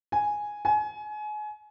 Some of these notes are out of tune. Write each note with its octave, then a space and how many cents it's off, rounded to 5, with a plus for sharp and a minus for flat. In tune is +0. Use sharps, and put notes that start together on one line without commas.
G#5 +0
G#5 +30